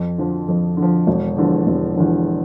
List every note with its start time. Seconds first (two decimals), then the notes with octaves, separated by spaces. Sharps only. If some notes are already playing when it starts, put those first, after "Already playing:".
Already playing: F2
0.18 D3 F3
0.48 F2
0.77 D3
0.82 F3
1.07 E1
1.37 E2 D3 F3
1.67 E1
1.96 E2 D3 F3